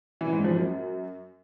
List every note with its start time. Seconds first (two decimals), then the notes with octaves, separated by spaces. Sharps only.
0.21 E3
0.33 G#2
0.44 F3
0.56 F#2